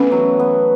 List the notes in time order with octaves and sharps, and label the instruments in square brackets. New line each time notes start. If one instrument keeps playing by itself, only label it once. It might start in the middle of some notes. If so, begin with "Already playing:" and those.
Already playing: [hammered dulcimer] E3 A3 B3 [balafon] C#4
[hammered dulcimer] F#3
B3